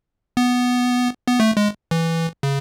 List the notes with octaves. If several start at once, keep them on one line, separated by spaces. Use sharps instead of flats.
B3
B3
A3
G#3
E3
C#3